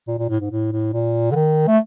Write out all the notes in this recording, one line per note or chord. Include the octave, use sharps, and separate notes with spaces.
A#2
A#2
A2
G#2
A2
A2
A#2
D3
D#3
A3